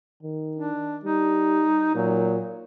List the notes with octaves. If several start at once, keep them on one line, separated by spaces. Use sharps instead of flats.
D#3
D4
G3 D#4
A#2 F#3